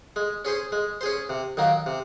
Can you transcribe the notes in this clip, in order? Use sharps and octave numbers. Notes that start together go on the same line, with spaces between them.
G#3
C#4 G#4 C5
G#3
C#4 G#4 C5
C3
D#3 F#3 A#3
C3